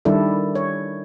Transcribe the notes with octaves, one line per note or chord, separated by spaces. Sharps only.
D#3 G3 D4 E4 A4
C#5